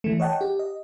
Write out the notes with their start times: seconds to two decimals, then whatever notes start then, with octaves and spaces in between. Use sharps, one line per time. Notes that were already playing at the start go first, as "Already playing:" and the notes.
0.04 E3 A3
0.20 C#5 D#5 F#5 G5 A5
0.41 G4
0.59 D#5